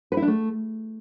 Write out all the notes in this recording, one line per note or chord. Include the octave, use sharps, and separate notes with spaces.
B4
E4
D4
A3